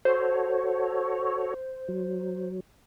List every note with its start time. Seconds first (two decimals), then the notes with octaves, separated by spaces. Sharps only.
0.05 F#4 A4 C5 C#5
1.88 F#3